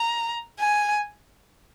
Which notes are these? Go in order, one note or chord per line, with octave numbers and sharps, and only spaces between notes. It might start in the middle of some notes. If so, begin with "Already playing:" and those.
Already playing: A#5
G#5